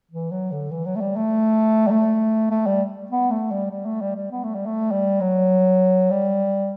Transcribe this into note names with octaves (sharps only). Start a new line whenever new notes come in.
E3
F#3
D3
E3
F#3
A3
G3
A3
G3
A3
A3
G3
B3
A3
G3
G3
A3
G3
G3
B3
A3
G3
A3
G3
F#3
G3